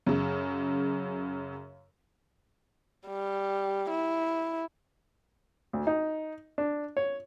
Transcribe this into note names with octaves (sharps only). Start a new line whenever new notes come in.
F#2 C#3
G3
E4
D2
D#4
D4
C#5